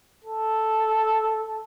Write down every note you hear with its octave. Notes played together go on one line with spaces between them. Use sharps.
A4